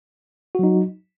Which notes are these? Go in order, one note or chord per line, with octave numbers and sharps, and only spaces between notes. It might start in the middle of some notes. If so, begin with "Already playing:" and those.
F#3 D#4 F#4